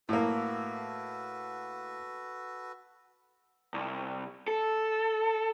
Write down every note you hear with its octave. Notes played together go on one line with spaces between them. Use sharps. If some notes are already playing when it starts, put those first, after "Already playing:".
A2 A#3 F#4 A4 B4
C2
A4